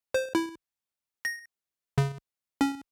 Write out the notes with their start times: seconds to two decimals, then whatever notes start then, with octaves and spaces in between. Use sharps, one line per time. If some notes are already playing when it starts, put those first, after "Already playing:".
0.14 C5
0.35 E4
1.25 A#6
1.98 C#3
2.61 C#4